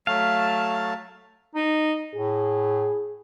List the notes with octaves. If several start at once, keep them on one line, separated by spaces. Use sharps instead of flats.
F#3 A3 F5 A5
D#4
A2 G#4